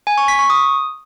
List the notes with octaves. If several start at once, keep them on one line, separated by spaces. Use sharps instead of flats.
G#5
C#6
B6
C#6
D#6